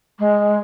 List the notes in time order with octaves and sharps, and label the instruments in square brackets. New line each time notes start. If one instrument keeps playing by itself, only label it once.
[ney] G#3